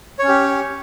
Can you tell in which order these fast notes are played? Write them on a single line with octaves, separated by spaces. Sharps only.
C#5 C#4 G4